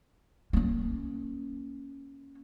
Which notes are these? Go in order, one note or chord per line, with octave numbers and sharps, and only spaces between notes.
A#3 C#4